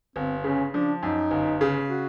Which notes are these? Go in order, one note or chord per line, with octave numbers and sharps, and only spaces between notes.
G1 C4
C#3 C#4
F3 D4
F#2 D#4
G1
C#3
F#4